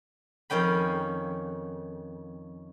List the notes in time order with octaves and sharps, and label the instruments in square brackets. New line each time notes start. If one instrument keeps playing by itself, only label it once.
[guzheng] F2 D#3 C#4 G5 B5